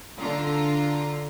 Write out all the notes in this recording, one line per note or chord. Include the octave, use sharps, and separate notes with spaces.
D3 F4 A#5